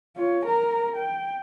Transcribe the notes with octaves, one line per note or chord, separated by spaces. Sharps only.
F4 C#5
A#4 A#5
G5